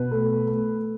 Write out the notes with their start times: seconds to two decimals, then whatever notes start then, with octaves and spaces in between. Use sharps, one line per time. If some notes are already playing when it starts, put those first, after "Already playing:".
Already playing: B2 B4
0.11 A3
0.47 A3